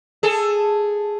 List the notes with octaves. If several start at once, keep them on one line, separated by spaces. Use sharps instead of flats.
G#4 A4